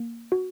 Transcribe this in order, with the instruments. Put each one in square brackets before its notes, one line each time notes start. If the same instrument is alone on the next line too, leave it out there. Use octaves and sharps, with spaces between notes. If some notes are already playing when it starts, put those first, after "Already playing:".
Already playing: [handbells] A#3
F#4